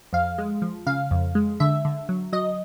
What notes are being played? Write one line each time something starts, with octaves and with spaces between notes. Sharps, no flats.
F2 F5
G#3
F3
C#3 F5
F2
G#3
D3 E5
D3
F#3
F#3 D#5